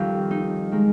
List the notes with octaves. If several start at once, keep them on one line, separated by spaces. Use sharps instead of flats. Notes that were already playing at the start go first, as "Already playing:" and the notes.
Already playing: F2 D#3 G3 F4 G4
D#4
D#3 G#3